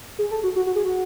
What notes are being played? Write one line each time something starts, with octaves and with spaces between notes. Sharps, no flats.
G#4
A4
F#4
F#4
F#4
G#4
F#4